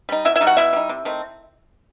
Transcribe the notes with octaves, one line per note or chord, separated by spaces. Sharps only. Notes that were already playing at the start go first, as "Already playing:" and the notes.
G3 D#4
B2 E4 E5
E4 E5
G3 D#4
F#4 F#5
B2 E4 E5
G3 D#4
C3
D#3 A3 C4